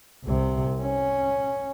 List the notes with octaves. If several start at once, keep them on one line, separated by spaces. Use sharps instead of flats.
C2 C3
C#4